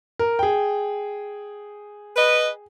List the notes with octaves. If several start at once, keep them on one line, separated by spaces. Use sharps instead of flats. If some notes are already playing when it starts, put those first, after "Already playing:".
A#4
G#4 G5
B4 D#5